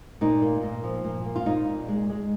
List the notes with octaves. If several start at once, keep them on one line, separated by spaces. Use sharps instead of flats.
A#2 D#4
A#3
A#2
F3
A#2
A#3
F4
A#2 D#4
A#2
G#3
G#3